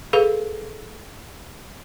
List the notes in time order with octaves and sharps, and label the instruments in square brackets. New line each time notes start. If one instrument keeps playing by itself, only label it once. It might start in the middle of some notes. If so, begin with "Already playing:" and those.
[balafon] G#4 A4 B4 F5